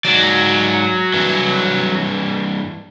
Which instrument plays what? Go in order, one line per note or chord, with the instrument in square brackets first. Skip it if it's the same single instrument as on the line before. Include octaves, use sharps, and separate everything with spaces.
[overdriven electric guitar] G#2 D5 [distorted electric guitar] F#3
[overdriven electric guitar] G2 E3